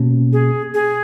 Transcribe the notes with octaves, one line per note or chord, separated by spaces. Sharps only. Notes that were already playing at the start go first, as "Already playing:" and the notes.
Already playing: B2 A#3 C#4
G#4
G#4